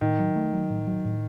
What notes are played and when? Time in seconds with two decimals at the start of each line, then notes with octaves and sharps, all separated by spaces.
0.01 A2 D#3
0.19 F#3
0.36 A3
0.53 F#3
0.70 A2
0.87 F#3
1.05 A2